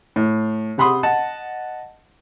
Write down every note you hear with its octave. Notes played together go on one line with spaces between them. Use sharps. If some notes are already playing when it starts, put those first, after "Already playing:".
A2
C3 F#5 B5 C6 D#6
D#5 F#5 A5